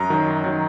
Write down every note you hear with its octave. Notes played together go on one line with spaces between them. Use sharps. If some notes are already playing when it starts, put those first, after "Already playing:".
Already playing: F#2 A#5
D#3 F#3
F#2
D#3 F#3